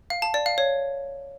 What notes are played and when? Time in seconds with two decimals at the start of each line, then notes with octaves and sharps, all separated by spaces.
0.10 F5
0.22 A5
0.34 D5
0.46 F5
0.58 C#5